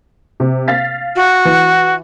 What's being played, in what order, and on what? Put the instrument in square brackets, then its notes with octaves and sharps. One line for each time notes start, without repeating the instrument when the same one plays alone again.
[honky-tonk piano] C3
F5 A6 B6
[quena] F#4
[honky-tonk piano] E3